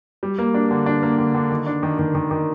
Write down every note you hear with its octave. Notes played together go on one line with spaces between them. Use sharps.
G3
A#3
D4
D3
D4
A#3
D3
D3
D#3
D4
D#3
D#3
D#3
D#3